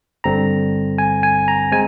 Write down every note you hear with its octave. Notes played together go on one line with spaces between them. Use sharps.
G1 G2 D3 G3 C4 A#5
G#5
G#5
A#5
G#3 C4 G#5